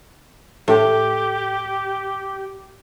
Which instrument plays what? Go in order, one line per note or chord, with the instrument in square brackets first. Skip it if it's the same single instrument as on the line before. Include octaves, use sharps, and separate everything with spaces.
[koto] A2 [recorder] G4